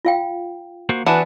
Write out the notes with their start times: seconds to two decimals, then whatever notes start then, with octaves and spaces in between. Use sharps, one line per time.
0.05 F4 F5 G5
0.89 A#3 F#4 C5
1.06 E3 B3 D4 E4 F#4 F#5 A5